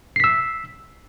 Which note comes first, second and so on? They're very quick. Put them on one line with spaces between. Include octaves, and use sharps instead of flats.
C7 B6 E6